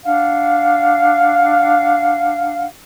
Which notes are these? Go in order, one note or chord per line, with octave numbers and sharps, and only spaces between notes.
D4 F5 F#5